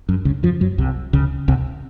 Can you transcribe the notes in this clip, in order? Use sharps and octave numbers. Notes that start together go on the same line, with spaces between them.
F#2
C#2 C#3
F2 F3
F#2 F#3
C2 C3
C#2 C#3
C2 C3